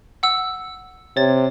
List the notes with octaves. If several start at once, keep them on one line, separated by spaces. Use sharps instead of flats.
F#5 E6
C3 C#5 A6